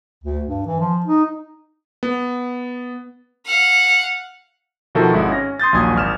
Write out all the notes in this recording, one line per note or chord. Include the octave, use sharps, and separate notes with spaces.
D2
G2
E3
F3
D#4
B3
F5 F#5
B2 D#3 F3 E4 F#4 A4
G#1 G#3 E4 F#5
C#4 A#6
C6 D#6 G6 A6
A#1 D#2 F#3 G#5 D#6 G#6
G#1 F6 E7